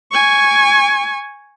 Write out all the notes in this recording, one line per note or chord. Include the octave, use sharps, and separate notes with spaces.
G#5 C#6